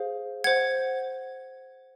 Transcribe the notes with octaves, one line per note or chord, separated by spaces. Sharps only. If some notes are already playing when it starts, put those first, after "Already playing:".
Already playing: G#4 C5 F5
C5 F#5 G#6